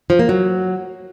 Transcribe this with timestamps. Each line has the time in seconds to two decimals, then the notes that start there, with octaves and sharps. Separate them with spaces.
0.10 F3
0.19 A#3
0.29 F#3